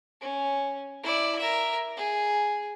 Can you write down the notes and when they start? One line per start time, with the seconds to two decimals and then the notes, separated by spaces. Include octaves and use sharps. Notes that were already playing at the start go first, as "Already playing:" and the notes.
0.21 C#4
1.04 E4 D5
1.39 A#4 E5
1.97 G#4